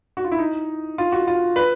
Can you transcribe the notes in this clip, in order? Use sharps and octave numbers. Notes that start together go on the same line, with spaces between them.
F#4
F4
E4
D#4
F4
F#4
F4
B4